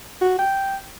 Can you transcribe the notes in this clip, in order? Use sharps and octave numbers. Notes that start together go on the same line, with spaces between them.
F#4
G5